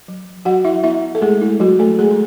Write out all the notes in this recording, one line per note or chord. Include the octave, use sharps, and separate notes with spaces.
F#3
F#3 F#4 F#5
E4 E5
B3 E4 E5
A4
G#3 A3 G#4
E4
F#3 F#4
A3 A4
G#3 A3 G#4
G#4